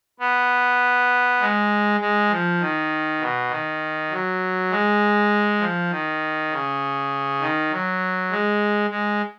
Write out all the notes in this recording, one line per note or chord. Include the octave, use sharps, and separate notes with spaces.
B3
G#3
G#3
F3
D#3
B2
D#3
F#3
G#3
F3
D#3
C#3
D#3
F#3
G#3
G#3